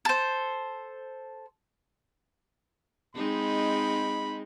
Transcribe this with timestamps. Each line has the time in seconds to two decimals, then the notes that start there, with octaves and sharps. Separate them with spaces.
0.05 A4 C5
3.15 G#3 C4 D#4 B5